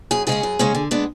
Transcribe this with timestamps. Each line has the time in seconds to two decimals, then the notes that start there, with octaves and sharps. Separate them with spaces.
0.11 F#2 G#4
0.27 C#3 G#3 C#4 G#4
0.43 F#2
0.59 C#3 G#3 C#4
0.75 D3
0.91 G#3 B3 D4